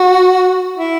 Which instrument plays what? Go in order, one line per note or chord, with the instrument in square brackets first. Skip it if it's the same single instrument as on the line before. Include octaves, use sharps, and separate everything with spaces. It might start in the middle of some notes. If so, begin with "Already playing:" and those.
Already playing: [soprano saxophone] F#4
E4